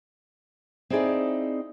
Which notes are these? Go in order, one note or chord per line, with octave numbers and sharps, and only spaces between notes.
C4 D#4 E4 G#4 A#4 D5